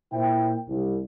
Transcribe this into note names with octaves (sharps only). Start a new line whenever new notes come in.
A#2 E4 C5 G5
C2